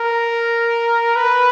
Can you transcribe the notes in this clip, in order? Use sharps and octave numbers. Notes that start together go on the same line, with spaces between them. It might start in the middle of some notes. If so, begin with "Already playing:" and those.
Already playing: A#4
B4